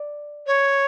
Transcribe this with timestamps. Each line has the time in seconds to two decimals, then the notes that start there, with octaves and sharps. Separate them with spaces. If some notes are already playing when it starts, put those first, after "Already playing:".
Already playing: D5
0.47 C#5